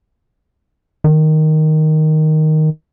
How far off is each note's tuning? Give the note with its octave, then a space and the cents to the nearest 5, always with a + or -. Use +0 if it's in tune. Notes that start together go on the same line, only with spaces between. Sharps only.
D#3 +0